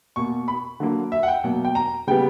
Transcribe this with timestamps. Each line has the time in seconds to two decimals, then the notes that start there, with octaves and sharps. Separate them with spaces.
0.16 B2 A#3 C#6
0.48 B5
0.80 D3 F#3 A#3
1.12 E5
1.23 F#5
1.28 G5
1.44 B2 F#3 A#3
1.65 G5
1.75 A#5
2.07 C#3 G3 B3 G5